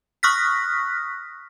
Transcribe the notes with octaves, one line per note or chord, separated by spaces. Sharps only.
C#6 D#6 F6 F#6 A#6 B6